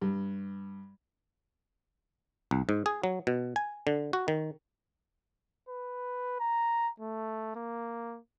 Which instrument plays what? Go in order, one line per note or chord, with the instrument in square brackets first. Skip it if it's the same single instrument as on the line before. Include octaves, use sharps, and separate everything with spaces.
[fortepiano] G2
[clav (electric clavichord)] C2
G#2
G#4
F#3
B2
G#5
D3
F#4
D#3
[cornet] B4
A#5
A3
A#3